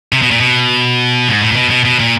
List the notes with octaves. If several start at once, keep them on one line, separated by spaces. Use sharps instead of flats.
C3
B2
A#2
B2
G#2
A2
A#2
B2
B2
B2
A#2